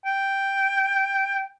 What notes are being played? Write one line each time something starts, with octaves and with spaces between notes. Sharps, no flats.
G5